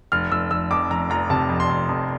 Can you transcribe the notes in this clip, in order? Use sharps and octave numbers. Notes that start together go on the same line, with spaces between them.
F1 F6
F1 E6
F1 E6
F2 D6
F1 A#5
F1 A#5
C3 A5
F2
C6
F1
F2